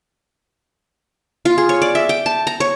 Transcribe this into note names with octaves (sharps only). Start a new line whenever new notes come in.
F4
G#4
C#5
D5
E5
G5
A5
A#5
C#5